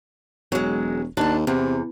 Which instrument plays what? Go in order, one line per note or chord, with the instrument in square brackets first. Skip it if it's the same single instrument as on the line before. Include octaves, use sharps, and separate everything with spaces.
[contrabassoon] E1 [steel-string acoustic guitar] F#3 G#3
[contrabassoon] D#2 [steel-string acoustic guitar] D4 A5
[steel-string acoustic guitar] E2 [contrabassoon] C3